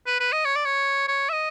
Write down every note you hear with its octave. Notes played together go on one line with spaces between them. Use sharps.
B4
B4
D#5
C#5
D5
C#5
C#5
E5
D#5